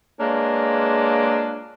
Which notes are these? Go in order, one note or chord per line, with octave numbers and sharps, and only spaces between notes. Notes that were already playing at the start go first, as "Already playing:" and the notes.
G#3 A#3 D4 F4 B4 C#5